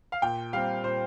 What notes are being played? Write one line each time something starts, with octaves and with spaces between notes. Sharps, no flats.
F5
A#2 G5
G3 C4 F5
A#2 C5